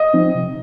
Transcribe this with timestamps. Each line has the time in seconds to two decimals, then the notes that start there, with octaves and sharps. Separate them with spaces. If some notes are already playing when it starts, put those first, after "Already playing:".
Already playing: D#5
0.14 F3 C4 D#4
0.35 C3